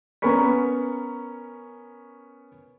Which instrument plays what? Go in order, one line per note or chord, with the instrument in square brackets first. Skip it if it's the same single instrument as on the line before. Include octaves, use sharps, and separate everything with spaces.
[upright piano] B3 C#4 A#4 B5 C#6 B6